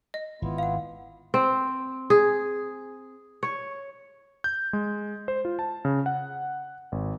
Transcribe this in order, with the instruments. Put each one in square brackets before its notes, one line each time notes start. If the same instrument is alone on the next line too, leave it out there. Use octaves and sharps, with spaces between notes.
[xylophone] D#5
[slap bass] G#1 [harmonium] B3 E4 F4
[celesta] F5 F#5
[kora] C4
G#4
C#5
[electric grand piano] G6
G#3
C5
F4
A5
C#3
F#5
G#1